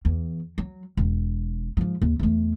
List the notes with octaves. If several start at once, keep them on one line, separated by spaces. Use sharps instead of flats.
E2
F#3
E1
G#2 F3
D#2
E2 A3